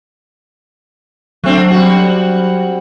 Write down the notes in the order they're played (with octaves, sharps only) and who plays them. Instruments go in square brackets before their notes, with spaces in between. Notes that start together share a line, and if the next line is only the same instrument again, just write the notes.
[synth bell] F#3 [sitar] A3 C4 D4
[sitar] G3 C4 F#4